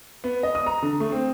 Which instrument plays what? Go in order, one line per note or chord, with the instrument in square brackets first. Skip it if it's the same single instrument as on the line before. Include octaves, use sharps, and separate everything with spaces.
[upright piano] B3
D#5
D#6
A#5
D3
A3
C4